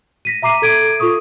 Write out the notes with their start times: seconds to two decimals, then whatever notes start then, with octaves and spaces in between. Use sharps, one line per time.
0.25 A#6 B6 D#7
0.42 E5 A#5 D6 C7 D#7
0.62 A4 G#6 D7 D#7
1.00 F4 A4 C#6 D#6